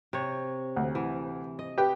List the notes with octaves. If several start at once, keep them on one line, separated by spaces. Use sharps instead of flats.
C3 C#5
D2
E3
D#5
G4 B4 G5